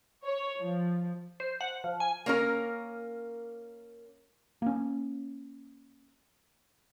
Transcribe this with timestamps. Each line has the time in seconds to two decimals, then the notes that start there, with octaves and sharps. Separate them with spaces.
0.25 C#5
0.59 F3
1.40 C5
1.61 F#5
1.84 F3
2.00 G#5
2.26 A#3 C#4 A#4
4.62 A#3 C#4